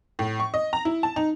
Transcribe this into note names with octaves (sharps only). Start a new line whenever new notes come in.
A2
C#6
D#5
A#5
E4
A5
D#4